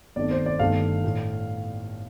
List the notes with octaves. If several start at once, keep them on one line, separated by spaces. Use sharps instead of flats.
G1 F2 D#3 A3 D5
C5
D5
G1 G2 D#3 A3 F5
A2